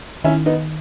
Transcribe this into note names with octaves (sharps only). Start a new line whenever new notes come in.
D#3 C#4 E4
B3 D#4